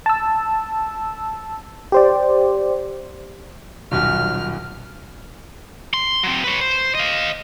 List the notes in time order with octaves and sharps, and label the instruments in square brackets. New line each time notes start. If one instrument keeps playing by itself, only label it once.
[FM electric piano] A5 E6
G4 C5 D5
[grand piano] D#1 B1 F#4 [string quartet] F6
[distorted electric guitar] C6
F#3 C4
B4 C#5
C5
D#5 F5